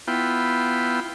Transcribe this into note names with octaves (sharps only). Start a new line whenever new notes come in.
B3 E4 F4 G5